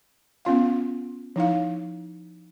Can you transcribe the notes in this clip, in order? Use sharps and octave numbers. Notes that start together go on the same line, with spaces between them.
B3 C#4 F4 F5
F3 D#4 E4 F5